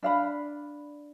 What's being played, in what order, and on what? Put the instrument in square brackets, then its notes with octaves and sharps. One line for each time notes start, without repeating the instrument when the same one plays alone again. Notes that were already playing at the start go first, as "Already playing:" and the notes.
[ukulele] D4 F5 B5